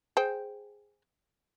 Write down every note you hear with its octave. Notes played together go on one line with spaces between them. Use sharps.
G#4 C5 G5